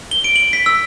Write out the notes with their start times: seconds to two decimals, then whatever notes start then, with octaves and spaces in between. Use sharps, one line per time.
0.11 G7
0.24 D7
0.36 F#7
0.53 B6
0.66 E6